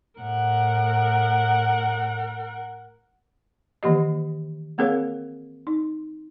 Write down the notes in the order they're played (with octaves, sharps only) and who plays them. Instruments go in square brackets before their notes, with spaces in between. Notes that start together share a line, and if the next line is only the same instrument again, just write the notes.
[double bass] A2 [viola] A#4 F#5
[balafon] D#3 E3 A#3 G4 D#5
A#3 C4 G#4 A#4 C#5 F5
D#4